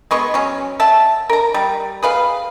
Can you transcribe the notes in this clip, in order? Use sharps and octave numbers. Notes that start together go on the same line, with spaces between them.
G#3 B3 C#6
F#3 C#4
E5 F#5 A5
A#4 A#5
G3
G#4 B4 F5